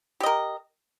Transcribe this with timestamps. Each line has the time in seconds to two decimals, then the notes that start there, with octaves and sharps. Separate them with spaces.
0.20 G4
0.23 D#5
0.26 A#4